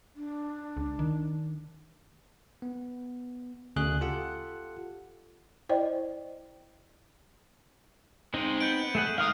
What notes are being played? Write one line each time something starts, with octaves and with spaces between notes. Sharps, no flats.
D4
C#2
D#3
B3
D2 C#3 G#4 F#6
F4 G4 A4 F#5
E4 C5 D5 D#5 G5
G#3 C4 D#4 F4
B3 G6 D7
A3 G#4 F#5
G#2 A#4 F5 F#5 D#6